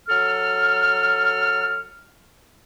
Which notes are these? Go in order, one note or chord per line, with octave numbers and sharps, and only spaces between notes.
F#3 A4 F6